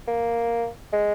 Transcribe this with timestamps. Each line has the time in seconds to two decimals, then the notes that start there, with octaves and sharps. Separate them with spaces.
0.08 A#3
0.93 G#3